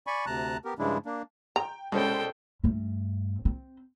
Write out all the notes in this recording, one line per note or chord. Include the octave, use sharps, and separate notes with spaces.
D5 G#5 B5 C#6
D2 C3 A5 A#5 F#6
B3 G4 A#4
G2 C#3 F3 G#3 D4 E4
A#3 D4
G5 A#5
C2 B2 G#3 C#4 A4 C5 G5
G2 A3
C4